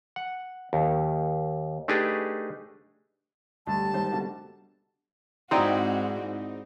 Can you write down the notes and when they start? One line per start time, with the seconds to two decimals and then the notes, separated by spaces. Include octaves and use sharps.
0.16 F#5
0.73 D#2
1.88 A3 D4 D#4 G4 G#4 B4
3.67 D2 G3 A5
3.94 G#2 D#3 C5
4.12 B2 D3
5.51 G#2 C4 D#4 E4 F#4 G#4 D5